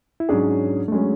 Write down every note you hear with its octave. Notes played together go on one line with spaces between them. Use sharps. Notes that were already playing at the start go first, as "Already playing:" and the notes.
E4
G#2 F#3 C#4 D4 G#4
A3
F#3 G#3 C#4 G#4